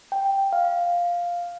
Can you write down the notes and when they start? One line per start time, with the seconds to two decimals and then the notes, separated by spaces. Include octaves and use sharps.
0.12 G5
0.53 F5